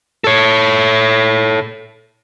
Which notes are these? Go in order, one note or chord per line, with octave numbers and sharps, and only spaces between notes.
A4 C#5